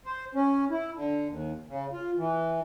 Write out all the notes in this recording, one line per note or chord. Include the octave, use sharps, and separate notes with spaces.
C5
C#4
E4
D3
D#2
C#3
F4
E3